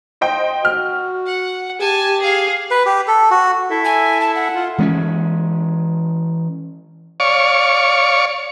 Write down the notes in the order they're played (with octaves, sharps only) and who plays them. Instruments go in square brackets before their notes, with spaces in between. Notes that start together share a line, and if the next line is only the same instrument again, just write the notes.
[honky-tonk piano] C5 D#5 G5
[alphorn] F#4 [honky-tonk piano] F6
[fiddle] F#5
[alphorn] G4 [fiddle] G#5 A5
[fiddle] G#4 F5
[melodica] B4
G4
A4
F#4
[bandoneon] E4 A4 E5
[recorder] G#5
A5
F#5
[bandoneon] F4
[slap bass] E3 G#3 A3 C#4
[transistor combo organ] C#5 D5 F5 C#6